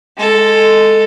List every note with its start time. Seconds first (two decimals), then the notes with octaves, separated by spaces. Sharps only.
0.17 G#3 A4